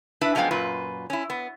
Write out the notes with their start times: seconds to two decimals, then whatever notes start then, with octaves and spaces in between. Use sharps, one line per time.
0.21 D4 E4 B4 E5
0.35 F#2 F3 G#3 B3 F5 G5
0.51 F#2 A#2 F4 B4
1.10 C#4 E4
1.30 B3